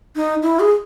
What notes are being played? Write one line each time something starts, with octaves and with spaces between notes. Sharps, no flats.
D#4
E4
G#4